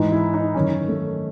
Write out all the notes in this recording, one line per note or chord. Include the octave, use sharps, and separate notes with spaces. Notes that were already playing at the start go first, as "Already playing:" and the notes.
Already playing: G#2 E3 D#4
E4
D#4
F#2 D#3 C#4
A3